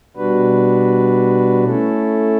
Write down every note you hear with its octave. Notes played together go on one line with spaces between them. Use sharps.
B2 G3 D4 F#4 B4
A3 C#4 E4 A4